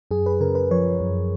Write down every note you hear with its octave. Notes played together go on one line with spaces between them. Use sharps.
F#2 G#4
B4
C#3 A#4
B4
F3 C#5
F#2